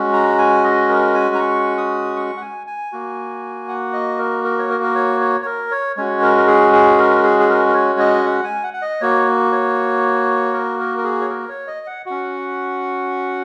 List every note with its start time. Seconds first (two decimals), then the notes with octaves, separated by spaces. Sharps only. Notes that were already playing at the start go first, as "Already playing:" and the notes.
Already playing: G#3 C#4 F#4
0.13 A#5
0.38 G#5
0.64 D#5
0.89 A#4
1.14 G#5
1.35 A#5
1.39 C#6
1.77 D#6
2.16 C#6
2.37 F#5
2.41 G#5
2.67 G#5
2.92 A#3 F#4
3.69 F#5
3.93 D#5
4.19 A#4
4.44 A#4
4.58 C#5
4.70 A#4
4.83 A#4
4.95 C#5
5.20 C#5
5.42 C#5
5.46 A#4
5.71 C#5
5.96 G#3 C#4 F#4 C#5
6.22 A#4
6.37 A#4
6.47 G#4
6.73 G#4
6.98 A#4
7.23 G#4
7.40 G#4
7.49 A#4
7.68 A#4
7.74 C#5
7.99 D#5
8.25 F#5
8.44 G#5
8.64 F#5
8.74 F#5
8.82 D#5
9.01 A#3 F#4 C#5
9.52 C#5
10.53 A#4
10.80 A#4
10.98 A#4
11.04 G#4
11.21 C#5
11.30 A#4
11.49 C#5
11.67 D#5
11.87 F#5
12.06 C#4 F#4 F#5